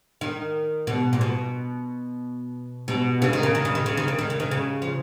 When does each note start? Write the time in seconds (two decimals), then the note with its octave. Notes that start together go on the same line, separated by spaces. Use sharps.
0.21 D#3
0.87 B2
1.13 A#2
1.21 B2
2.88 B2
3.22 C#3
3.33 D#3
3.43 C#3
3.55 D#3
3.65 C#3
3.75 D#3
3.86 C#3
3.97 D#3
4.08 C#3
4.19 D#3
4.30 C#3
4.40 D#3
4.51 C#3
4.82 F3